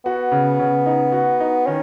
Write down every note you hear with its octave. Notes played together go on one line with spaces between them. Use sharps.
B3 F#4
C#3
C#3
D#4
F#4
D#4
D#3 C#4